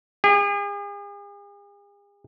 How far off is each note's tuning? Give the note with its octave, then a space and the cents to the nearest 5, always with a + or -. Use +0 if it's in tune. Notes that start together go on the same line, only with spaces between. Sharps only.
G#4 -45